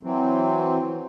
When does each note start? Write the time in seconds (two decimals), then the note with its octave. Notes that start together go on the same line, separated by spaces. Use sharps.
0.03 E3 F#3 C4